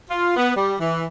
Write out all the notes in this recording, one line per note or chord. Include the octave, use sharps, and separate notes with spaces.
F4
B3
G3
E3